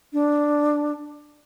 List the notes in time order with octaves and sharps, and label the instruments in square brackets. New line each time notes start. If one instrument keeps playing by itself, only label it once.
[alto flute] D4